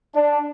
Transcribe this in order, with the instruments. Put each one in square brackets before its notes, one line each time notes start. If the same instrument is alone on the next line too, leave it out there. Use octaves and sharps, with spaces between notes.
[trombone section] D4